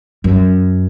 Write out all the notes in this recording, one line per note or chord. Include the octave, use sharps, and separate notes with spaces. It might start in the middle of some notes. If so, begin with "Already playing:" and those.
F#2